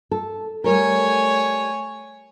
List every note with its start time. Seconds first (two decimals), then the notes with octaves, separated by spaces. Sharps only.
0.11 A4
0.64 G3 A3 A4 A#4 C#5 G#5